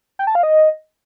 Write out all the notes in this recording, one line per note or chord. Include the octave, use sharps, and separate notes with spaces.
G5
A5
F5
D#5